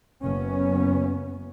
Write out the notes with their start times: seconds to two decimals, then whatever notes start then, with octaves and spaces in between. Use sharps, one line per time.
0.22 F#1 B3 C#4